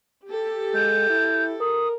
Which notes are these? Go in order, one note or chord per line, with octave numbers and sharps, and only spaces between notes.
G4 A4
G#3 G6
E4
A#4 D#6